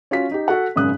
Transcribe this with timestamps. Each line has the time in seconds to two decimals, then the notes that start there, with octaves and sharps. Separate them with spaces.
0.11 C#4 F4 F#4 B6
0.31 D#4 G4
0.48 F#4 A4 F#5
0.76 G#1 F#2 C#3 D#6 F#6